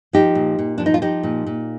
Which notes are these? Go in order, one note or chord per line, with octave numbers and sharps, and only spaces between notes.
F3 D#4 G4
A#2
A#2
F3 D4
D#4
F4
F3 D#4 G4
A#2
A#2